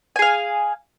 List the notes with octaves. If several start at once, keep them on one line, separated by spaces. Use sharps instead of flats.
G#4 F5 G#5